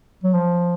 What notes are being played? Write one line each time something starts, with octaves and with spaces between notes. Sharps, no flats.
F#3
F3